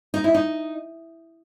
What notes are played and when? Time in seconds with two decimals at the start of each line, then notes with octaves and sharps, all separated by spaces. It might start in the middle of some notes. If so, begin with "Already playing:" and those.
0.14 D#4
0.24 E4
0.34 D#4